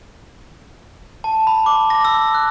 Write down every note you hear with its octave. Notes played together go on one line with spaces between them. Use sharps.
A5
B5
D6
A#6
E6
F#6